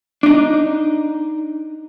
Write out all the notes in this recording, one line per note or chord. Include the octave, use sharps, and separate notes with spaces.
D4 D#4